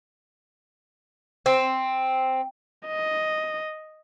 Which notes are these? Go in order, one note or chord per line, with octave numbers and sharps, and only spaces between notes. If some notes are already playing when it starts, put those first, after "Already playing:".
C4
D#5